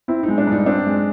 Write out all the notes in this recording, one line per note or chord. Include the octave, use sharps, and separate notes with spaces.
C4 E4
D#4
G#3
D4
G2
D#4
C4 D4
G#3